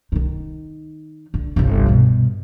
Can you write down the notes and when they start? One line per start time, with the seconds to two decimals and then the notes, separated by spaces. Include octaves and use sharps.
0.12 D#3 D#4
1.34 D3
1.56 G1 C2
1.86 G2 B2